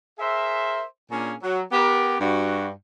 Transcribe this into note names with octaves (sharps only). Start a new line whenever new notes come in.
G#4 A#4 C5 E5
A#2 A#3 C#4 D4 G#4 G#5
F#3
B3 G4 A#4
G2 F#4